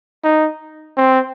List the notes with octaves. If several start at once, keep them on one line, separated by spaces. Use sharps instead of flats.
D#4
C4